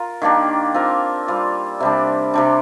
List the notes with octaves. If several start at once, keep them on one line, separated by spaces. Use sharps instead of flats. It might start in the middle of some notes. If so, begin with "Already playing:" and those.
Already playing: F4 A#4
D#3 A#3 D4 G4
C4 F4 A#4
G3 C4 F4
C3 G3 D4
C3 G3 D4